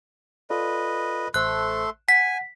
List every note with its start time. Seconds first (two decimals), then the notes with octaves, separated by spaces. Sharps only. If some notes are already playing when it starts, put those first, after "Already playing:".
0.50 F4 A4 B4 D5 D#5
1.34 A1 A3 A4 C5 C6 F#6
2.09 F#5 G#5 B6